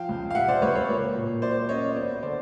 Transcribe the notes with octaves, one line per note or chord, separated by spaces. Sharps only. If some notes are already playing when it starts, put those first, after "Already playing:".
Already playing: F3 F5 G5
C#2
F5
C3 E5 F#5
C5 D5
C#2 B4 C#5
B4 C#5
A#3
A#2
F#3 C5 D5
C#4 C#5 D#5
B3 C5 D5
D3 C5 D5